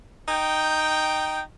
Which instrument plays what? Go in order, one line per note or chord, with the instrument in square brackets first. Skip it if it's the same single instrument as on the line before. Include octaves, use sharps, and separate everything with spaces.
[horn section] D#4 G5